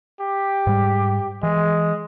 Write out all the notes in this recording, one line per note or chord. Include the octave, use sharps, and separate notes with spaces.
G4
G#2 G3
E3 G#3